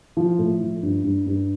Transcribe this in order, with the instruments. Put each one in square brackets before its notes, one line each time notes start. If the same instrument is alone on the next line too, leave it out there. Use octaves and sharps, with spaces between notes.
[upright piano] F3
A2
F3
G2
G2
G2